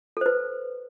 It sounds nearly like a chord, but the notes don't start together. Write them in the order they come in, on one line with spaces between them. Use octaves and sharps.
A4 C5 B4